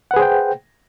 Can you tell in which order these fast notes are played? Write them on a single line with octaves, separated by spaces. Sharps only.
F#5 B4 G#4 C5 G5